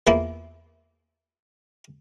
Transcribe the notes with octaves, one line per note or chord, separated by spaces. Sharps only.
E2 F3 A#3 E4